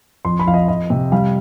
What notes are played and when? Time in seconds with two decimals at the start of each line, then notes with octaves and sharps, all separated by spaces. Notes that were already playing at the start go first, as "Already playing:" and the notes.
0.25 F2 C6
0.39 B5
0.47 F2 F5
0.54 D#5
0.68 F2 D#5
0.90 C3
1.12 G3 F5